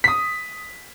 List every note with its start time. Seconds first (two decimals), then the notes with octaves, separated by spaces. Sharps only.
0.04 D#6 B6